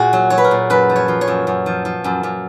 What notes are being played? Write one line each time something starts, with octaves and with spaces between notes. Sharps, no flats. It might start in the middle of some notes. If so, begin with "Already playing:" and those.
Already playing: A#2 F#4 G#4 A#4
F#3
F#3 C#5
B4
A#4
A#2
F#2 B4
F3
C#5
F3
C#5
F#2
F#2
F3
F3
F#2
F#2